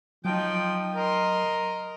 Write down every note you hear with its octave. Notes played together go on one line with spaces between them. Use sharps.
F3 F#3 D#4 G5
A#4 D#5 C6